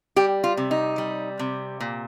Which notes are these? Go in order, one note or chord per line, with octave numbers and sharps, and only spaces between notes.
G3 G4
F4
C3
D#4
G3
C3
A#2